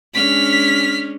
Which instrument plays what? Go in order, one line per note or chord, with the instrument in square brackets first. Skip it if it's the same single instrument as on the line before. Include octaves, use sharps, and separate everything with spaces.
[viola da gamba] G#3 C#4 D4 [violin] F6 B6